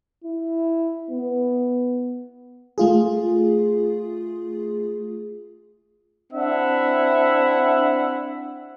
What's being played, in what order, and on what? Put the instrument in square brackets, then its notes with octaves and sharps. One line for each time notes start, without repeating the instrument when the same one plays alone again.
[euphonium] E4
B3
[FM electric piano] A3 F4 G#4
[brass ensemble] C4 D4 E4 E5 F#5